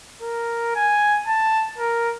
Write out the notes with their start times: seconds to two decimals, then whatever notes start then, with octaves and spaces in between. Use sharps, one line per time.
0.22 A#4
0.76 G#5
1.27 A5
1.78 A#4